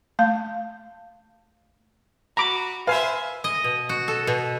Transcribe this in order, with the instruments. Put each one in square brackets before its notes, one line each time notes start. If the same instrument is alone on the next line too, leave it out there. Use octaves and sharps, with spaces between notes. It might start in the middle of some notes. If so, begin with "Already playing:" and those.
[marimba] A3 F5 G6
[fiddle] F#4 [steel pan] A#5 B5 D6
[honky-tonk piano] B4 G#5 [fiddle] C5 E5 [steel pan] F5
[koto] D#5
B2
F#4
A4
B2